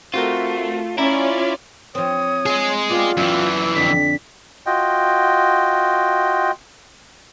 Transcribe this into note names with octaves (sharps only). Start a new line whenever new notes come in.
A3 C4 F4 F#4 A#4
C#4 E4 F4 D5 E5 A#5
F3 C4 C#5 D#6
F4 G#4 D#5
C6
B3 F4 G4 D5 D6
F#2 E3 G4 D5 E5 E6
F2 D3 B6
F4 F#4 D#5 G5